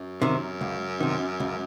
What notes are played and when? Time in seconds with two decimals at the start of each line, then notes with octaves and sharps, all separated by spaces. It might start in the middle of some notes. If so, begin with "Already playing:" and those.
Already playing: F#2
0.22 C3 D#3
0.61 C#2
1.00 C3 D#3
1.40 C#2